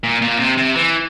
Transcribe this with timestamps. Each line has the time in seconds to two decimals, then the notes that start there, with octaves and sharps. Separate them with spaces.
0.03 A#2
0.22 A#2
0.39 C3
0.57 C3
0.75 E3